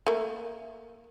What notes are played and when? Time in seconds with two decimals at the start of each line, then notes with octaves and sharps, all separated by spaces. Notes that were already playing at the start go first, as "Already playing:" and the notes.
0.07 A3 A#3